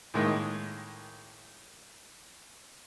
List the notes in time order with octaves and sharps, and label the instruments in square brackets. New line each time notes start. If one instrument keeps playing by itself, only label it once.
[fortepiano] A2 D#3 G#3 A#3